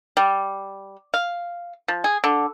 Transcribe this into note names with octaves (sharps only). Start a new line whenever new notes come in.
G3
F5
F3
G#4
D3